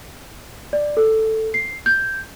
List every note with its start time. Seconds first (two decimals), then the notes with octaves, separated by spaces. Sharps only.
0.73 D5
0.97 A4
1.54 C7
1.86 G6